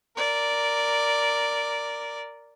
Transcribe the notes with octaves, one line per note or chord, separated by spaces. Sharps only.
A#4 D5